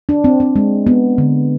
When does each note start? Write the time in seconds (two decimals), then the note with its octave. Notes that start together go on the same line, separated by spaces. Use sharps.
0.09 D4
0.24 C4
0.40 C4
0.56 G#3
0.87 B3
1.18 D3